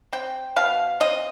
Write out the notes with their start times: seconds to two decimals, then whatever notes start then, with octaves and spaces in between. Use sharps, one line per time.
0.13 C4 G5
0.56 B2 F5
1.00 C4 D#5